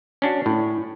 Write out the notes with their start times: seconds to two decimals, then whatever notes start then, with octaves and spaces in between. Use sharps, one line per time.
0.22 C#4 D4 F#4
0.46 A2